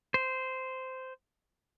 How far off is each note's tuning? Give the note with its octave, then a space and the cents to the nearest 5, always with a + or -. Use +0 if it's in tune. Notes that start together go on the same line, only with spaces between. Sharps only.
C5 -10